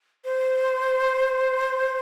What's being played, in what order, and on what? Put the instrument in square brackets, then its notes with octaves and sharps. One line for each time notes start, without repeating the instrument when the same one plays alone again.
[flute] C5